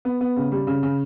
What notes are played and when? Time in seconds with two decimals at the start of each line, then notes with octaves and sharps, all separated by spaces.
0.05 B3
0.21 B3
0.36 C#3
0.52 G3
0.67 C#3
0.83 C#3